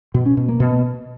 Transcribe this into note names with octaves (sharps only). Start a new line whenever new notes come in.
B2
C#4
B2
A#3
B2